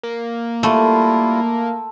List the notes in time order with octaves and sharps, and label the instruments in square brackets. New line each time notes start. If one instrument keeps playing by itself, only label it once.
[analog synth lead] A#3
[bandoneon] G3 E4 F4 [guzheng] A3 [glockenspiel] A5 C6 E6